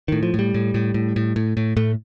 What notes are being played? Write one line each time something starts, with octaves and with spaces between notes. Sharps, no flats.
A2 D#3
F3
A2
G3
A2
A2
A2
A2
A2
A2
A2 A3